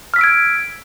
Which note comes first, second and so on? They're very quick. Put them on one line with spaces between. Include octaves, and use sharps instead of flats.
F6 B6 E6 D7 G#6